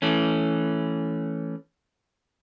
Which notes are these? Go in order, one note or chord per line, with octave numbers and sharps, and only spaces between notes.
E3 A3 C#4